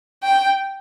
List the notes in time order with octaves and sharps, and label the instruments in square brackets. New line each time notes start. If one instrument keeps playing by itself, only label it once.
[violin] G5